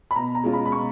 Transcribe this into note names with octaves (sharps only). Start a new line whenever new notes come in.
B5
B2 A#5
A#5
G#3 C#4 F4
B5
B5
B2 C#6